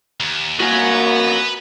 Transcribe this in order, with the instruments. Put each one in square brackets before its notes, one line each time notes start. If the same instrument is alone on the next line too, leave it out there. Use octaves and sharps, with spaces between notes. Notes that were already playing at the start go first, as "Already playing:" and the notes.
[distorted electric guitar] D#2
[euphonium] A#3 [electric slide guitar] F#4 A#4 G#5 [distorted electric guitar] B4 F#5